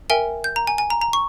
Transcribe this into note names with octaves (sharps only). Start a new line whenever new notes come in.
A#4 E5 G5 G#5
G6
A#5
G#5
G#5
A#5
A#5
C#6